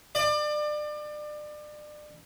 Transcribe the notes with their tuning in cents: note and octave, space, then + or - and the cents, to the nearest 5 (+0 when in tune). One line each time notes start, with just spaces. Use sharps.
D5 +30